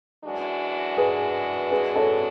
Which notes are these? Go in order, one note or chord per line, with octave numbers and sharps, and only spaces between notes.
F#2 E3 G#3 D4 F#4
G#4 B4
G#4 B4
A4 C#5